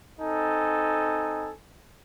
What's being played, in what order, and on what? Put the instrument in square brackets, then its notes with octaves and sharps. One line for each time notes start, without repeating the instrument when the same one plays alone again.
[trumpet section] C4 D#4 A4 G#5